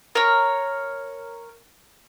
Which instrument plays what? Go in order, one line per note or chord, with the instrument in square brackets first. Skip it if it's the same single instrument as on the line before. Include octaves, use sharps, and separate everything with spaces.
[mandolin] A#4 C#5